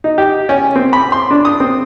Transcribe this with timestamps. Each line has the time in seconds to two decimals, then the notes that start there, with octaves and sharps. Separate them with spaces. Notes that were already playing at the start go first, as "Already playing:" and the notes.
0.04 D#4
0.18 G4
0.49 C#4
0.76 C4
0.93 B5
1.12 C6
1.31 D4
1.45 D#6
1.60 C4